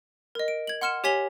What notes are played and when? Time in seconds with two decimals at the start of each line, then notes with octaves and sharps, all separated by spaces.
0.35 A#4 D#5
0.48 D7
0.67 G#6 F#7
0.81 F#5 C6 F6 C#7 E7
1.04 G4 C#5 G#5 B6 F7 G7